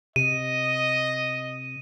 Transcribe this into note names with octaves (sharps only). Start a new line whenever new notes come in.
C3 D#5 D#7